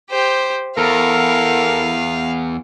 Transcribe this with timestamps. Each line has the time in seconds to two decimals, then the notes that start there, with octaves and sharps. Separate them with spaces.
0.10 G4 C5
0.78 E2 A4 A#4 F5